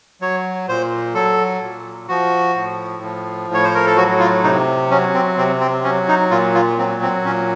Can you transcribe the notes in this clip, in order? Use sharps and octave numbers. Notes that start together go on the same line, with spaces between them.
F#3 C#5
A#2 C5
F#3 A4
A#2
F3 F#4
A2
F3
A2 C#5
C5
A#4
A4
F#3 F#4
F4
C3 D#4
F#3 C#4
C4
C3 C4
C4
F#3 C#4
D#4
A#2 F4
F4
F#3 C4
C4
A#2 C#4